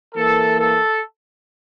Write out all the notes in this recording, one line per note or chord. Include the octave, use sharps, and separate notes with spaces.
E3 A#3 A4
A4